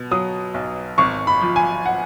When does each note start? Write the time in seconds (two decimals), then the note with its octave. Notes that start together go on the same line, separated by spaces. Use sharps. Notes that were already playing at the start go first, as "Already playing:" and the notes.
Already playing: B2
0.11 F#3 D#6
0.54 B1
0.98 G#1 C#6
1.27 B5
1.41 F3
1.56 G#5
1.86 F#5